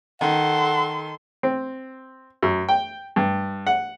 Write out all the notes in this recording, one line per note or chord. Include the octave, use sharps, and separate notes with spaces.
D#3 A4 F#5 C6
C4
F#2
G5
G2
F#5